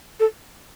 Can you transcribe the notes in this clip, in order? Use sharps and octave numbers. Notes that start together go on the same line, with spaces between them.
A4